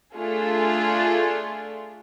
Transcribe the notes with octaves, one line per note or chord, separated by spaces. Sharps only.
A3 D4 F4 G#4 A4